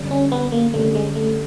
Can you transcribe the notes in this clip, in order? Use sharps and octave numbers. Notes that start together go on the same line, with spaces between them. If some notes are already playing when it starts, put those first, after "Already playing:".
Already playing: G1 F#2 D3 G3
C#4
B3
A#3
G1 F#2 D3 G3 A3
G#3
A3